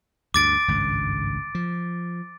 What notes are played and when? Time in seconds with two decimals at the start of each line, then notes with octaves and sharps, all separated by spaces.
0.34 D2 G2 D6 A6 D7
0.68 G#1 C#2 G2
1.55 F3